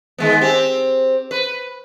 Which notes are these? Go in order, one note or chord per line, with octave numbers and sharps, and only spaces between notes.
D#3 G#3 B3
C4 G4
B4